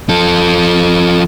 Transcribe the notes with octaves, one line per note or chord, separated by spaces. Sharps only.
F3 A4